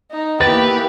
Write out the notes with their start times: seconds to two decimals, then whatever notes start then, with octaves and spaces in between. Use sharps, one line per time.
0.11 D#4
0.41 E3 A#3 B3 G4 B4 A6